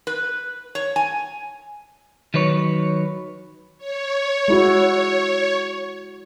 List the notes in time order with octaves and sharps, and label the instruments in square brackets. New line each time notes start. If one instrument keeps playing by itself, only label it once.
[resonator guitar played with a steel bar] B4
C#5
G#5
[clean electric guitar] D#3 F#3 B4 C#5
[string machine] C#5
[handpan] G#3 E4 F#4